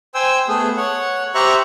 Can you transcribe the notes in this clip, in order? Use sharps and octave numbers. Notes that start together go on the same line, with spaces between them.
C5 G5 G#5 E6
A3 B3 G#4
C#5 F#5
G4 C5 E5 A#5 C#6 F#6